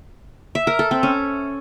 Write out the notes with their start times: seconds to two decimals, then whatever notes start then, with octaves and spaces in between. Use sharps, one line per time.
0.55 E5
0.67 A#4
0.79 A4
0.91 C4
1.03 C#4